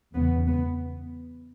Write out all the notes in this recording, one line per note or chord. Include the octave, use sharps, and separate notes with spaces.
E2 C#3 B3
B3